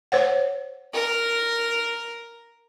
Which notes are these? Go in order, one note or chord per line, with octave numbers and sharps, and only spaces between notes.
C5 C#5 F#5
A#4